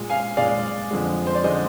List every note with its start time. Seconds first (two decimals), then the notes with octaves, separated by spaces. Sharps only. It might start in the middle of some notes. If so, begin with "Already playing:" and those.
Already playing: A#2 G#3
0.10 F5 G#5
0.37 A#2 G#3 D5 F5
0.91 F2 D3 G#3
1.27 C5
1.35 D5
1.44 D3 G#3 C5 D#5